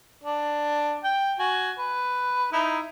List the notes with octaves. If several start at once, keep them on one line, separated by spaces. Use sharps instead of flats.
D4
G5
F#4 G#5
B4
D#4 E4